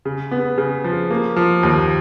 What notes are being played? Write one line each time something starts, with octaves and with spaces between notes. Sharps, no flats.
C#3
B3
C#3
F3
A#3
F3
D#2